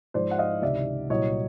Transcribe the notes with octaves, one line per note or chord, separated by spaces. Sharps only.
G#2 F3 G#3 C5 D5
F#5
D#5 F5
C#2 C3 D#3 D5 E5
C2 A#2 F#3 C#5 D#5